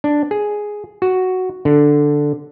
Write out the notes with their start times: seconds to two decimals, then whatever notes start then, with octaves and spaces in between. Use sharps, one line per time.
0.04 D4
0.31 G#4
1.02 F#4
1.65 D3